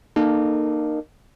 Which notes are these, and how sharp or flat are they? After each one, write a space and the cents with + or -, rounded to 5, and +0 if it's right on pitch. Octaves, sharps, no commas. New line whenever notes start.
A#3 +0 D#4 -30 A4 +0